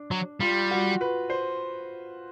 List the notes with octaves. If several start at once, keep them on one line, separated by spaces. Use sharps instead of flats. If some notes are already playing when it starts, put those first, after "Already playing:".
Already playing: D4
F#3
G3 F4
F#4
B4
C5